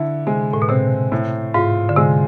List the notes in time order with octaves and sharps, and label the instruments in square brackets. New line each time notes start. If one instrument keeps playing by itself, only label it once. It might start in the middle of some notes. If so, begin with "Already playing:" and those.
Already playing: [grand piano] D3 E4
[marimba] C3 [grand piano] G#3
[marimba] A2
B2
[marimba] C3 [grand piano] C4
[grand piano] A2
[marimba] G#2 [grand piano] F4
[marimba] D3
[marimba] C3 [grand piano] G#3